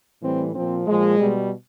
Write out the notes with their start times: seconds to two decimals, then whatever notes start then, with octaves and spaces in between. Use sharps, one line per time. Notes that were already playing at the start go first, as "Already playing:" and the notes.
0.21 A2 E3 G3 C4
0.54 A#2 F3 C4
0.86 A#2 F3 G#3
1.19 B2 G3